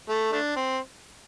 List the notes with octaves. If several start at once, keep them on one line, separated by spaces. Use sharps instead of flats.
A3
A3 D4
C4